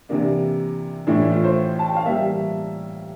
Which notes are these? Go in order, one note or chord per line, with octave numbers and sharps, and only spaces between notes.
C3 E3 A#3 D4
A2 E3 A3 D4 E4
E4
F4
C5
A5
G5
F5
E3 G3 A#3 E5